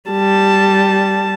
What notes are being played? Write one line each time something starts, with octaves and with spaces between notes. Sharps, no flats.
G3 A5